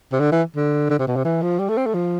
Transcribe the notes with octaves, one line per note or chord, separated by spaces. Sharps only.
C3
D3
E3
D3
D3
C3
B2
C3
E3
F3
G3
A3
C4
A3
F3